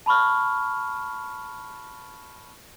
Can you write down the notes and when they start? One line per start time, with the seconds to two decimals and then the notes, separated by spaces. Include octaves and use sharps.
0.06 A5 B5 C#6 F6